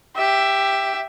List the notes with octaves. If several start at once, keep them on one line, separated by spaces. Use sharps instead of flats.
G4 E5